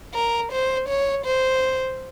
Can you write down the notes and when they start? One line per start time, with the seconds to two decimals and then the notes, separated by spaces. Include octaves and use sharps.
0.14 A#4
0.52 C5
0.89 C#5
1.25 C5